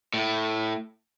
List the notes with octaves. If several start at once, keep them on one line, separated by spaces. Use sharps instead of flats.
A2